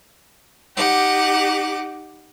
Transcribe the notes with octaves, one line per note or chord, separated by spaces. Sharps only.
D#4 G4 F#5 D6